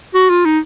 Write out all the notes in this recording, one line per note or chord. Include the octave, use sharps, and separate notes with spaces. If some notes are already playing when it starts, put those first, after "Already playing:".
F#4
F4
D#4